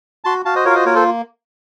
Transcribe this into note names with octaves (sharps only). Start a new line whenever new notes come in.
F#4 A5 C6
F#4 F5 A5
C5 D#5
F4 A#4 C#5
F5
C5 D#5
A#3 A#4 C#5
A4 C5